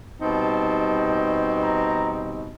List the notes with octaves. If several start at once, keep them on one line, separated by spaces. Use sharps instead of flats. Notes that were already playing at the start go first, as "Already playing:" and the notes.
B2 G3 C4 D#4 A5
A#5